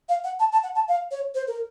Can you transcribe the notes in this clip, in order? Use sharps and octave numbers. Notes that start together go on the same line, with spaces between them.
F5
F#5
A5
A5
F#5
A5
F5
C#5
C5
A#4